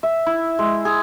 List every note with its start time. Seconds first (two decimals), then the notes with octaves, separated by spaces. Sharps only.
0.03 E5
0.26 E4
0.59 G#3
0.85 G#4